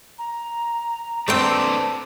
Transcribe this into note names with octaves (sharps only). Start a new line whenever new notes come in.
A#5
A3 C4 D4 B4 C5 G5